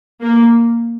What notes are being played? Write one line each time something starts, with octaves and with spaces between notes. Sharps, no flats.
A#3